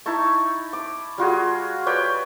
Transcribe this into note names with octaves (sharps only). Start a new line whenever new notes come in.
D#4 E4 A5 C#6
D6
G3 F4 F#4 G#4
B4 C#5 D5 G5